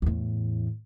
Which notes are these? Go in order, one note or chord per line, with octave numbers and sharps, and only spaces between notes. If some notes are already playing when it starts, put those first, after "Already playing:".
E2 A2